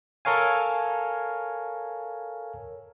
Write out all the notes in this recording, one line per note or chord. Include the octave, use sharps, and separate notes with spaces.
A4 A#4 C#5 F5 G#5